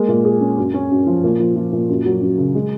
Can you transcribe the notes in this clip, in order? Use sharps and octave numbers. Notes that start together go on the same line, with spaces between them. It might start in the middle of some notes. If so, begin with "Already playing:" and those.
Already playing: G#3 A#3
A#2
G#4
C#4
F#2
C#4
F#2
F3
A#2
F3
F3
A#2
F#2
F#3
F#2
C#3
G#3